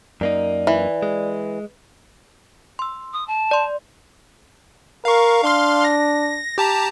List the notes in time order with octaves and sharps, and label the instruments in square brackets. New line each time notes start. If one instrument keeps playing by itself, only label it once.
[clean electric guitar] F#2 A#3 D#4 [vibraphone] D5
[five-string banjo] E3
[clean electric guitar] G#3
[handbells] C6 E6
[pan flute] D#6
A5
[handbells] D5 C6
[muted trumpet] A#4 [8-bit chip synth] F5 C#6
[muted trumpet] D4 [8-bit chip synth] F5 C6 F6
[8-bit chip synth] A#6
G4 A5 A#5